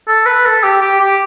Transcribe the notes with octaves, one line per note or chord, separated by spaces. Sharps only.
A4
B4
A4
G4
G4
G4